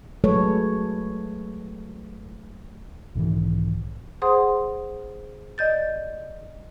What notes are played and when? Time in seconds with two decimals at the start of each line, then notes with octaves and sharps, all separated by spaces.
0.24 F#3 G#3 A3 A4 B4 C#5
3.15 B1 G#2 D#3 E3
4.22 G#4 C5 F#5 C6 D#6
5.58 D5 D#5 G6 A6